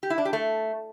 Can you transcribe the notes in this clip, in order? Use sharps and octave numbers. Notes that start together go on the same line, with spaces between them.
G4
E4
D4
G4
A3